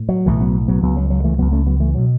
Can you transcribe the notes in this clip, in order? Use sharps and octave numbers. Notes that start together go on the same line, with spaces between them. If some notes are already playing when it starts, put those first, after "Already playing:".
Already playing: A2
F#3
B1 A2 E3 A3
F#3 B3
F#3 B3
C#2 C#3 F#3 B3
F#3
F#3
E3 A3
C#2 C#3 F#3 B3
A3 C#4
F#3 B3
E3 A3
B2 F#3